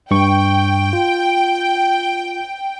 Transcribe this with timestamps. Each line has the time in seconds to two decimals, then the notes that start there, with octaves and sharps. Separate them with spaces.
0.11 G2 G5 C#6
0.93 F4